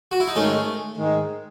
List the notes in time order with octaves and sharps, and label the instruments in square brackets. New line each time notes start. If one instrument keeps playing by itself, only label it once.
[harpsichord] F#4
E4
D#4
[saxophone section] G#2 D#3 G#3 [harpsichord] A3 C#4
[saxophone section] G#2 D#3 G#3